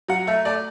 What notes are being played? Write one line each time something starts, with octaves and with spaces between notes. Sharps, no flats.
F#3 F#5
A3 E5
A3 D5